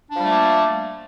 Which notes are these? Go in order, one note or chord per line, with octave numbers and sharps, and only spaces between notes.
F3 G3 A3 A#3 D4